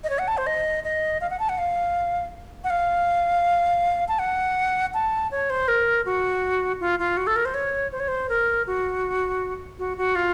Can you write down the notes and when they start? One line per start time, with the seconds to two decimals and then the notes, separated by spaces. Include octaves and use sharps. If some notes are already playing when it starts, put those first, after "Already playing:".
0.04 D#5
0.10 C#5
0.19 F#5
0.28 A5
0.37 C5
0.47 D#5
0.84 D#5
1.21 F5
1.30 F#5
1.39 A5
1.49 F#5
1.58 F5
2.64 F#5
2.70 F5
4.08 A5
4.19 F#5
4.94 A5
5.31 C#5
5.50 C5
5.68 A#4
6.06 F#4
6.80 F4
6.99 F4
7.17 F#4
7.27 A4
7.36 A#4
7.45 C5
7.54 C#5
7.92 C5
8.00 C#5
8.08 C5
8.29 A#4
8.67 F#4
9.79 F#4
9.97 F#4
10.16 F4